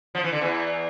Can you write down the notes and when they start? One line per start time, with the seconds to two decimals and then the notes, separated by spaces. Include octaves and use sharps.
0.15 F3
0.24 E3
0.32 D3
0.41 E2 E3